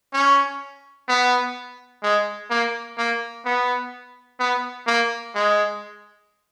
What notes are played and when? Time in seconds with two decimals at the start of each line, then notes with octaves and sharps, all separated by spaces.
0.14 C#4
1.09 B3
2.03 G#3
2.51 A#3
2.98 A#3
3.45 B3
4.40 B3
4.87 A#3
5.35 G#3